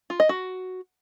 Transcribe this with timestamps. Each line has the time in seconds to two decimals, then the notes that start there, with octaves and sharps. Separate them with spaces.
0.10 F4
0.20 D#5
0.29 F#4